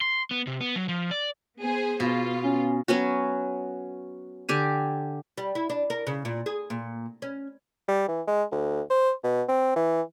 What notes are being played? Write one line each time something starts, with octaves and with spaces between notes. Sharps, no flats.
C6
B3
C3
B3
F#3
F3
D5
B3 G#4 C5
B2 B3 F4
C#4
F#3 B3 C#4 F#4
D3 G4 G#5
G3
E4
D4
A#4
C#3
A#2
G#4
A#2
C#4
G3
E3
G#3
D2
C5
B2
C4
E3